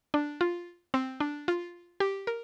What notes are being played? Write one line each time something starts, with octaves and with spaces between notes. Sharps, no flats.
D4
F4
C4
D4
F4
G4
A#4